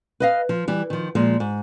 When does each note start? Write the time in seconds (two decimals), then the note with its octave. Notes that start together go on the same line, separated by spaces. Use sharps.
0.20 B4 D#5 F5
0.49 F3
0.68 E3 G3
0.90 D#3 F3
1.15 A#2 F3 G#3
1.40 G#2